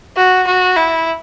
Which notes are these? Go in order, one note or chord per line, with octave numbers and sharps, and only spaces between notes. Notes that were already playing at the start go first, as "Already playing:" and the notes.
F#4
F#4
E4